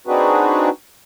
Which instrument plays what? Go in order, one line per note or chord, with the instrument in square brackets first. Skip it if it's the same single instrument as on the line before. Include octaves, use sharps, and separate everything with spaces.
[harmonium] C4 D4 D#4 F#4 G#4 B4